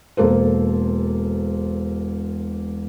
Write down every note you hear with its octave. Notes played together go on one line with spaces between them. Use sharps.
E1 A#3 A4 C5